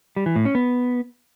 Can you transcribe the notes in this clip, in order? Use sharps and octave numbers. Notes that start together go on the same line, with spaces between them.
G3
E3
A2
C#4
B3